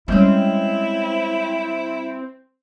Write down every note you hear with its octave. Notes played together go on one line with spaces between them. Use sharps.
G3 G#3 C4 C#4 E4